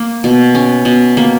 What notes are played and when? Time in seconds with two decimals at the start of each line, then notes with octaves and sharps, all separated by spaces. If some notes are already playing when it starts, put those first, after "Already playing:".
Already playing: A#3
0.24 B2
0.55 C#4
0.85 B2
1.17 A#3